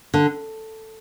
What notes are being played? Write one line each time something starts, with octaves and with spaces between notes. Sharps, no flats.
D3